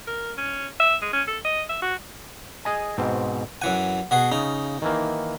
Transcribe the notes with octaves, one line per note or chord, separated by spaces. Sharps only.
A#4
C#4
E5
G#3
C#4
A4
D#5
E5
F#4
G#4 D#5 G#5
G#2 B2 C4
F#2 E3 F#5 G#5
B2 F#4 G#4
C#3 D#4
D#3 E3 A#3